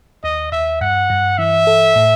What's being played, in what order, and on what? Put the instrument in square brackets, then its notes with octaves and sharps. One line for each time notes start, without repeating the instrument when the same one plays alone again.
[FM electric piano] D#2 [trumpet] D#5
[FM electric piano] D#2 [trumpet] E5
[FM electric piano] G2 [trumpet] F#5
[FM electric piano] G2
[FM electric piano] E3 [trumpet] E5
[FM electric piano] A4
A2